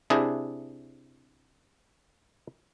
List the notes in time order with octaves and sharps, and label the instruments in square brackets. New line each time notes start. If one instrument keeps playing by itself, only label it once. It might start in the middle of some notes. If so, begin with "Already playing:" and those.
[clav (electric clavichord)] C3 D4 E4 G#4